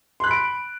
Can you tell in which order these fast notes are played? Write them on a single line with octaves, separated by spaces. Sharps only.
C6 F#6 B5 D7